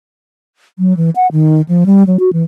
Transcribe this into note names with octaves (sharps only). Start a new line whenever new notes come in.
F#3
E3
F#5
D#3
F3
G3
F#3
F#4
E3